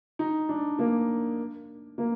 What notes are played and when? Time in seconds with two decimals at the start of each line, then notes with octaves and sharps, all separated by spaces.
0.19 D#4
0.49 D4
0.79 A#3
1.98 A#3